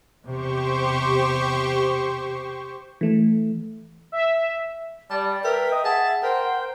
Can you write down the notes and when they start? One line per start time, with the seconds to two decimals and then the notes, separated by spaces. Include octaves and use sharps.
0.25 E2 C3 G4 C5 C#6
3.01 E3 A3
4.12 E5
5.10 G3 D5 A5
5.44 A#4 B4 E5 G5
5.72 D#5
5.85 G#4 F#5 A5
6.23 A#4 C5 G5